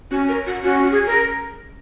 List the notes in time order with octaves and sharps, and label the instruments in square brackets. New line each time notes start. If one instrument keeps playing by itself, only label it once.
[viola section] C#4 [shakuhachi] F#4
[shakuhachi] A#4
F#4
[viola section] C#4 [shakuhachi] F#4
[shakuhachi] F#4
G#4
A#4